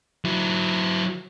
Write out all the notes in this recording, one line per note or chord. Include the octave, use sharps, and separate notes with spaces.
F#3 E4